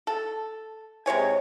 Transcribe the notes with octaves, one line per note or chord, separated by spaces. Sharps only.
A4
C3 G#3 C#5 G#5